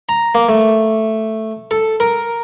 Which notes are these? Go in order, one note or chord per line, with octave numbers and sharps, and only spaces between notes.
A#5
A#3
A3
A4
A#4